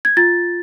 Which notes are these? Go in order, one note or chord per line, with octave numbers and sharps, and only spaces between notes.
G#6
F4 A6